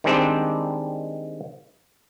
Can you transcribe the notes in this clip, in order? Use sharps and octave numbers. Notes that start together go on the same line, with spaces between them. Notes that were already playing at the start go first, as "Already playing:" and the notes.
D#3 G3 G#3 C4 D4